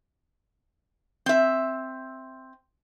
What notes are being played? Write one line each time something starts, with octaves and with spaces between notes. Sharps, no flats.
C4 E5